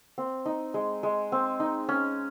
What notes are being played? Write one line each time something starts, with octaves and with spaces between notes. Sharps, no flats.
C4
D#4
G#3
G#3
C4
D#4
C#4